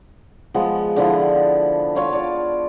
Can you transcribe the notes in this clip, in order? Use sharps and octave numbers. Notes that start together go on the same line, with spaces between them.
F3 G#3 B3
D3 F3 E4
F4 C#5 F5
D5